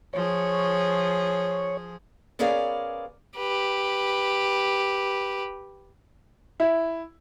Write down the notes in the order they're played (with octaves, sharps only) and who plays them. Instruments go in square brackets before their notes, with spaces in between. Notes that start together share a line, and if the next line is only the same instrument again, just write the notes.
[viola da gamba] F3 G#4 [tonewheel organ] C#5
[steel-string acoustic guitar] B3 C#4 G#4 A#4 D5 F5
[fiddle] G4 B4
[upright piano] E4